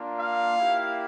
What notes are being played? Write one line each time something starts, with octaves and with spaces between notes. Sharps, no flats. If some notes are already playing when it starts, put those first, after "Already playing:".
Already playing: A#3 D4 F4
F5
A#3 E4 G4